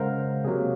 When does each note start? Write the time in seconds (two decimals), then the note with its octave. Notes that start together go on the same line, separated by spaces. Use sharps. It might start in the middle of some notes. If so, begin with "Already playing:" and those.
Already playing: C#3 G#3 A#4 C5 F5 F#5
0.44 C3 F#3 A#3 G#4